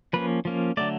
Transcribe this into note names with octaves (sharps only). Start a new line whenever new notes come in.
F3 A#3 C#4 B4
F3 A#3 C#4
D3 F#3 A3 D5